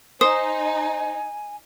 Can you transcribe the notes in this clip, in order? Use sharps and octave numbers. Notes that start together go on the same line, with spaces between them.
D#4 C5 G#5 D#6